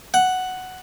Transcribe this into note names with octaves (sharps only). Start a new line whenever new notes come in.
F#5